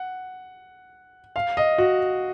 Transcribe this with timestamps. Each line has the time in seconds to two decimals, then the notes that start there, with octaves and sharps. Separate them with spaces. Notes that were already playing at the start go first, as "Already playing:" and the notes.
Already playing: F#5
1.36 F5
1.57 D#5
1.78 F#4